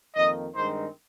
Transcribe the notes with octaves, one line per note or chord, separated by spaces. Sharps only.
F2 D#3 A#3 D#5
G2 D#3 G#3 C4 D#4 C5